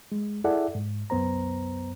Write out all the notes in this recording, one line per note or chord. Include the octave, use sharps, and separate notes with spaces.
G#3
E4 G#4 A4 D5 E5 F#5
G#2
C2 F#2 B3 C5 A#5